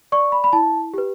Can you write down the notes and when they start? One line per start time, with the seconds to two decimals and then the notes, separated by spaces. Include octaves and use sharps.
0.12 D5 C#6
0.32 B5
0.44 B5
0.53 E4 A5
0.94 G4 B4